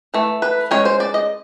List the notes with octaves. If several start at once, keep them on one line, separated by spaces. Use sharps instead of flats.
E3 A3
B4
G#3 C#4 C#5
C5
D5
D#5